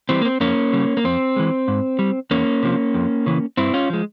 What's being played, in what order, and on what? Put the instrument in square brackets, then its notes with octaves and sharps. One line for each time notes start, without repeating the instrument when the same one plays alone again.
[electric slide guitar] E3 G3 C4
A#3
C4
F2 A#3 C#4
C#3 G3
A#3
F2 C4
E3 G#3
G#2
G3
E2 A#3 C#4
C3 F3
F2
C#3 E3
G2 C4 E4
C#4 F4
F3 G#3